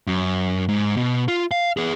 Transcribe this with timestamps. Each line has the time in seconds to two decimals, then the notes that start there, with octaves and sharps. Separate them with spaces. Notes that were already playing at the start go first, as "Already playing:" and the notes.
0.07 F#2
0.69 G#2
0.97 B2
1.28 F4
1.51 F5
1.77 B3 G#4